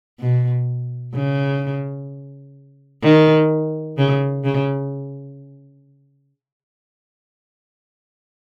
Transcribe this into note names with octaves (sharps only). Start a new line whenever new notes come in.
B2
C#3
D#3
C#3
C#3